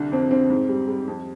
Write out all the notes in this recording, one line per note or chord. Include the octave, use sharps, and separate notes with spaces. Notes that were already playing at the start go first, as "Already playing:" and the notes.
Already playing: C2 D3
F2 C4
D3 C4
G#2
G3
G3
F2